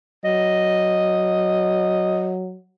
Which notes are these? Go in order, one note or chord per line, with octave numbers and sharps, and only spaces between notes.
F#3 D#5